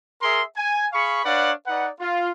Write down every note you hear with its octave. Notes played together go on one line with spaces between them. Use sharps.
G#4 A#4 E5 C6
G#5
G#4 F5 B5 C#6
D4 B4 C#5 D5 F5 F#5
D#4 B4 D5 F#5
F4